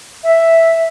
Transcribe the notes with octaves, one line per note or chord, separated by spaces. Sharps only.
E5